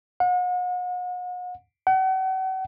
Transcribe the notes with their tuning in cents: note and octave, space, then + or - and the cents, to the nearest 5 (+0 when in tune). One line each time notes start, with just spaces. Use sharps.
F#5 -40
F#5 +40